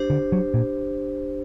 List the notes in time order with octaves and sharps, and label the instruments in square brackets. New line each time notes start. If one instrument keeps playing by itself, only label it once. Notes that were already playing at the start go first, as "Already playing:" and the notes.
Already playing: [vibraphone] D4 G4 C5
[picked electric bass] D3
F#3
A#2